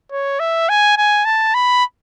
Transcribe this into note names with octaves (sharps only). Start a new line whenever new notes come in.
C#5
E5
G#5
G#5
A5
B5